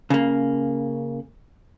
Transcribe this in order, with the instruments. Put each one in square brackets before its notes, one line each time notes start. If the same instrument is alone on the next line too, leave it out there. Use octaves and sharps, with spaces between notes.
[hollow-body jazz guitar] C#3 A#3